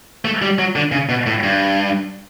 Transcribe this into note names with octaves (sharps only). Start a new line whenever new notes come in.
A3
G3
F#3
D3
C#3
B2
A2
G2